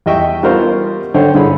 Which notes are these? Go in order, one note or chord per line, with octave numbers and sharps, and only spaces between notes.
E2 G3 D#5 E5 G5 C#6
G3 B3 F4 A#4 C5 C#6
D3 C5 C#5 G5
G2 D3 E4 G#4 C#5 B5